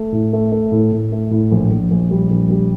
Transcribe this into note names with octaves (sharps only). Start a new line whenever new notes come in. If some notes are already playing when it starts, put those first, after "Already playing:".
Already playing: A3
A2
A3
A3
A2
A2
A3
A2
A#1
A#1
A#1
G3
A#1
G3